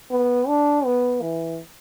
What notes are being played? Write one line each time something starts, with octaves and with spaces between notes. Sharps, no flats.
B3
D4
B3
E3